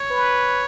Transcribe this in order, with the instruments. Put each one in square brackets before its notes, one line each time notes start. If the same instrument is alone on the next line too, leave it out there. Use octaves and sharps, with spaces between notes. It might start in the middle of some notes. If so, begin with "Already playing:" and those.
Already playing: [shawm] C#5
[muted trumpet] B4